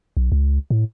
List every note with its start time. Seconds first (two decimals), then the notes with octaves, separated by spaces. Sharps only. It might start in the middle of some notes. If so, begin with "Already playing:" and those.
0.17 B1
0.32 C#2
0.70 A2